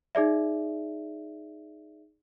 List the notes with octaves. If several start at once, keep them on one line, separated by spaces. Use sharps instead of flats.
D#4 G#4 D5 E5